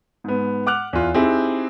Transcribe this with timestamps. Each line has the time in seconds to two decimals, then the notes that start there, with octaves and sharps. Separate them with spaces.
0.24 G#2 B3
0.66 F#5 D6 F6 F#6 F7
0.93 E2 F4
1.14 C4 D#4 E4 G4 G#4